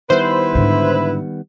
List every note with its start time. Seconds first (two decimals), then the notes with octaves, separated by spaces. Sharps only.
0.10 D#3 G3 B3 E4 B4 C5
0.55 G#2 D3